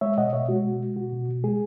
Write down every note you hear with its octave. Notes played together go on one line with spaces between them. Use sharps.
G#3 C#5 E5
B2 D#5 F#5
B2 C#5 E5
G#3 F#4
B2
G#3
B2 F#4
B2
B2
G#3 G#4